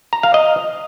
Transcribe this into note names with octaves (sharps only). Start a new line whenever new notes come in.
A#5
F5
D#5